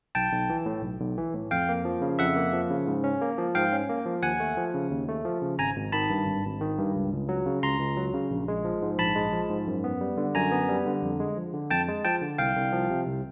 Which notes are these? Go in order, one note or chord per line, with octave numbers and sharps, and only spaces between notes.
B1 G5 A5
B1
E3
A2
B1
B1
E3
A2
F2 F5 G5
A#3
F3
C#3
F2 E5 F#5
A#3
F3
C#3
G#2
C#4
A#3
F3
G#2 F5 G5
C#4
A#3
F3
D#2 F#5 G#5
A3
F3
C#3
D#2
A3
F3
C#3
G#1 G#5 A#5
G#1
D#3 A5 B5
G2
G#1
G#1
D#3
G2
C#2
C#2
F#3
C#3
C#2 A#5 C6
C#2
F#3
C#3
A#1
G#3
F3
G#2
A#1 A5 B5
G#3
F3
G#2
F#2
B3
G3
D3
F#2 G#5 A#5
B3
G3
D3
F2
G#3
F3
D3
F2 G5 A5
G#3
F3 G5 A5
D3
C2 F5 G5
C2
F3
C3
C2